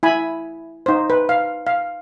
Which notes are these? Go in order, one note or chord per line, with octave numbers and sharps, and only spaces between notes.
E4 G#5 B5
D#4 C5
B4
F5
F5